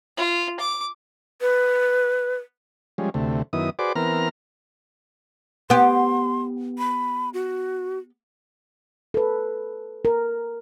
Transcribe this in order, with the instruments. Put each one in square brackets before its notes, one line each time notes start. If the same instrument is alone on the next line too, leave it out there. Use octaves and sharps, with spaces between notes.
[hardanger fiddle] F4
D6
[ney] B4
[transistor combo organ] F3 G3 G#3 C#4
D2 C3 A3
F#2 D#3 B3 E4 D#6
F#4 G#4 B4 C5 D5 D6
E3 B3 C4 A#4 A#5 F6
[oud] B3 G4 [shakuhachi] C6
[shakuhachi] B5
F#4
[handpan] A4 B4
A#4